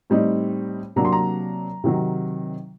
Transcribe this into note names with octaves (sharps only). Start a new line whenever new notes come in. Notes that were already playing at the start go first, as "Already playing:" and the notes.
A2 G3 C4 D#4
C3 F#3 A#3 D4 A#5
C6
A#5
C3 D#3 F#3